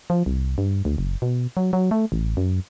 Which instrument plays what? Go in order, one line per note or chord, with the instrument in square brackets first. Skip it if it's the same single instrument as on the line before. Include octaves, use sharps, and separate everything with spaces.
[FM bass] F3
C2
G2
D2
F#1
B2
F#3
F#3
A3
A1
F#2